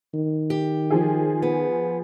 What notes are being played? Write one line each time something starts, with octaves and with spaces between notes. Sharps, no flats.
D#3
G4
F3 G#4
B3